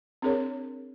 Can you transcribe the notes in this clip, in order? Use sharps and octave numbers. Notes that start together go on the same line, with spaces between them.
C4 D4 G#4 A#4 C#5